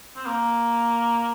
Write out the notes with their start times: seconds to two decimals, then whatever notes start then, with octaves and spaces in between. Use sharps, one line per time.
0.16 C4
0.26 A#3